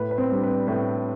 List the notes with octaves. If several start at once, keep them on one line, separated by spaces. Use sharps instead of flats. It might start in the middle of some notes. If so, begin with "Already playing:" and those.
Already playing: A2 B4
B4
C4 C5
G3 D4
B4
A2 B4